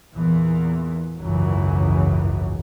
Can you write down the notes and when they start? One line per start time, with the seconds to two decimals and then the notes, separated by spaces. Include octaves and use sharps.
0.15 E2 A#2 E3
1.17 G#1 C#2 F#2 E3 F#3